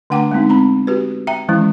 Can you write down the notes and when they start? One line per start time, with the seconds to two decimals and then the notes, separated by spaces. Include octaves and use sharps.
0.10 D3 A3 D4 F#5 G5 D6
0.31 G#3 B3 C4 D#4
0.49 C4 A#5 B5
0.87 F#4 G4 B4
1.27 E5 G5 A#5
1.48 D#3 E3 F#3 G#3 C#4 E4